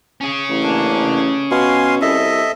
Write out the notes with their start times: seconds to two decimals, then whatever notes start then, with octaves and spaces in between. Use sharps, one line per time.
0.21 C#4 G#4
0.50 A1
0.63 A#3 D4
1.51 B2 F5 G#5 C6
2.01 C2 A4 D#5 E5